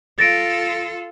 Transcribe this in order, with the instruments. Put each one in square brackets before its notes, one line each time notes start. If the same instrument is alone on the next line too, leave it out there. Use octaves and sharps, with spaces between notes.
[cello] F4 A4 [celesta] A6 A#6 D7